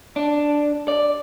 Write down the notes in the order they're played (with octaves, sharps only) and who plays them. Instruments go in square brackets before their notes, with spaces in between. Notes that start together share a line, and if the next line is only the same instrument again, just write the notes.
[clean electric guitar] D4
D5